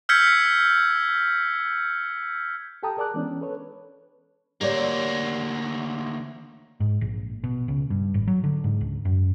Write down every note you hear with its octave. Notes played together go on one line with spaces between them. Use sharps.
E6 F6 G6 G#6 B6 C#7
G4 A4 G5 A5 A#5 D#6
G#4 A#4 D5 A5 D6 F#6
E3 G#3 B3 C#4 D4
C#4
A4 B4 C#5
D2 A#3 G4 C#5 D5
G#2
A#1
B2
C#2
G2
G#1
F#3
D3
G#2
C#2
F#2